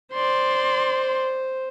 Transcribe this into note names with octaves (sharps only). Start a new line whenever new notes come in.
C5 D5 C6